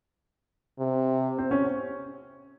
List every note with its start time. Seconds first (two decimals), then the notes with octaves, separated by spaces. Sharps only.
0.79 C3
1.38 C4
1.51 C#4